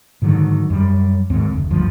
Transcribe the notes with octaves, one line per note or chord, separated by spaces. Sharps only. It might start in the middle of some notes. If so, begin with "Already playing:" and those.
G#2 D3 D#3 F#3
F#2 G3
D1 D#2 G#2 C4
F1 D2
F#1 D2 G2 F3